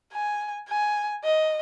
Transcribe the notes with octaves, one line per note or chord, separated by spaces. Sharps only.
G#5
G#5
D#5